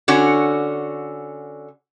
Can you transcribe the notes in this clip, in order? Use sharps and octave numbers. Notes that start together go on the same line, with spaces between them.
D3 C#4 F#4